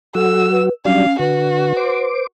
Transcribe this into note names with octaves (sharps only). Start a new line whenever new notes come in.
F#3 F#4 A4 E6
B4
F#3 G3 C#4 D4 F5
D3 F#4 B4
C5 D6